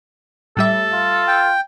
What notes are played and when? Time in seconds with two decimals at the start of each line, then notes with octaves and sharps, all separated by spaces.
0.57 A2 G3 A4 E5
0.93 F4
1.27 G5